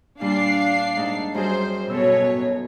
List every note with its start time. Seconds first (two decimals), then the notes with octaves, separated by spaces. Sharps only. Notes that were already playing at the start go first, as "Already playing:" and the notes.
0.21 A#2 G3 D4 F5 C7
0.97 G#2 D#4 A5
1.35 F#2 G3 G#4 C5
1.90 B2 A4 C#5 E6